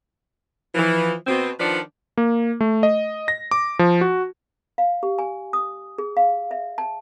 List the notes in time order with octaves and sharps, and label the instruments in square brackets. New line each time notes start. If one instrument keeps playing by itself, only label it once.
[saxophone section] E3 F3
B2 C4
D#3 F3 D4 B4 D5 F#5
[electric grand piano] A#3
A3
D#5
A#6
D6
F3
F#4
[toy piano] F5
G4
G#5
D#6
G#4
F5
E5
A5